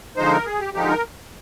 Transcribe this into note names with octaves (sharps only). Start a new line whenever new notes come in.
D3 F3 G#3 D#4 C5
A#4
G#4
G4
D3 F3 G#3 D#4 G4
A#4